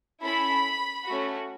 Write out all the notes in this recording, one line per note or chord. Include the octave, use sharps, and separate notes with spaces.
C#4 E4 A4 B5
A3 C#4 F#4